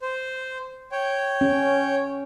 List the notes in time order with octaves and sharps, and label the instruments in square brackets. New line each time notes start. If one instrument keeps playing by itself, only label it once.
[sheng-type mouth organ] C5
C#5 G5
[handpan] C#4